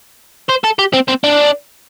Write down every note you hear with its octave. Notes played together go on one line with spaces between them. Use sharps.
C5
A4
G4
C4
C4
D4